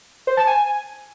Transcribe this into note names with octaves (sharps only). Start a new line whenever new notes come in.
C5
A5
G#5